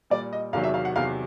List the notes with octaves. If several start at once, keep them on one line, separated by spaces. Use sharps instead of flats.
A#2 G3 D5
D#5
E2 C3 D#3 F#3 F5
E5
F5
F#5
E2 C3 D#3 F#3 F5